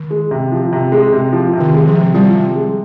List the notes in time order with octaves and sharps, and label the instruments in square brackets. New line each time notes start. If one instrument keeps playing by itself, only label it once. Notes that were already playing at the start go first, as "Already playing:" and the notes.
Already playing: [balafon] D#3
[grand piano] G#3
C3
F3
C3
G#3
C3
F3
C3
[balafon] D#3
[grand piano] G#3
[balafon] F3
[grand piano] C3
[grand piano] F3 [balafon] G3
[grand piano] C3
G#3